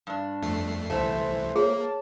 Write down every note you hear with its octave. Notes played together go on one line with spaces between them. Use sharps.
G2 D4
F2 A3 C7
C2 E3 A3 C5 E5
A#3 G#4 C#5
A5